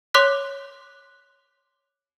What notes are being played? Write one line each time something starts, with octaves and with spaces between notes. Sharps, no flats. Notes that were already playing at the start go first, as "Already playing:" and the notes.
C#5 C6 D6 F#6 B6